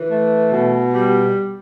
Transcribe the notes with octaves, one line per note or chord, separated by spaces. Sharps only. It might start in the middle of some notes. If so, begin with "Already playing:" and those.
Already playing: E3
A3
B2
G3